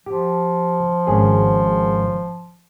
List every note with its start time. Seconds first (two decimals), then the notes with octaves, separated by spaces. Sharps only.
0.06 F3 G4
1.07 G#1 C#4 G#4